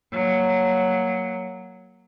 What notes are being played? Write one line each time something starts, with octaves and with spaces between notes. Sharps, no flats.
F#3 A#3